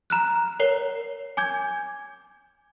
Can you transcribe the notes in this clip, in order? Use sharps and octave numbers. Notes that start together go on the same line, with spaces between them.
A#5 F6 F#6
A#4 C#5 C7 G7
G#5 D6 G6 G#6